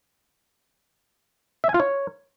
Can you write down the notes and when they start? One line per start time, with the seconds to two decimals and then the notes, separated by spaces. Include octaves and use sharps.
1.64 E5
1.69 G#5
1.74 F4
1.80 C#5